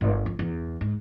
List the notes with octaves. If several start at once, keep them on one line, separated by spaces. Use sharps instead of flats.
G1
F2
E2
G#2